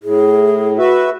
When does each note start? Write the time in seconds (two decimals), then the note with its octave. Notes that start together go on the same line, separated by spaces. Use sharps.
0.04 A2 G#4
0.78 F#4 B4 E5